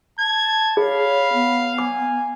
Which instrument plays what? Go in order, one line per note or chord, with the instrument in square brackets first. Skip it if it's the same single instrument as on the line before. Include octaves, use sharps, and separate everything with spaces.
[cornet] A5 [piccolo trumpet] G#6
[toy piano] G#4 [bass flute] C#5 [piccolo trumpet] F5 [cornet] B5
[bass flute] B3
[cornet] G#5 [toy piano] D6